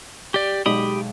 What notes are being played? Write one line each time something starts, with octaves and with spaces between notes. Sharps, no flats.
G4 D5
B1 G#3 G4 D5 B5 D#6